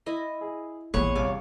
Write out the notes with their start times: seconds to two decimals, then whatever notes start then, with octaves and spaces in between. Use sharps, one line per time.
0.06 E4 D#5 C6
0.41 G#4
0.94 A1 E2 A#2 G#4 C#5 F#5 B5
1.15 C2 F5 G#5 D6